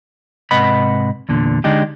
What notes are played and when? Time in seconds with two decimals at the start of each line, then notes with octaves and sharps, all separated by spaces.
0.51 G#2 C3 B4 D#5 F#5 B5
1.29 E2 A#2 D3
1.64 D3 G#3 D4 D#4 G4